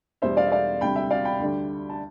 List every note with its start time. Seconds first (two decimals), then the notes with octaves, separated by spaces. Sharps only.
0.22 E2 B2 G3 D4 C5 E5
0.37 D5 F5
0.47 E5
0.51 D5 F5
0.81 D2 C3 G3 G5 B5
0.96 E5 G5
1.10 D5 F5
1.25 G5 B5
1.40 D2 D3 G3 D4
1.90 A5